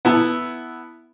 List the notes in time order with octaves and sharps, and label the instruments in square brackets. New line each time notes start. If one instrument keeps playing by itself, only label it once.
[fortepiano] B3 E4 A5